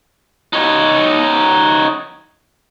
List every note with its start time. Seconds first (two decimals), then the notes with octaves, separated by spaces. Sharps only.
0.53 D#4 C#5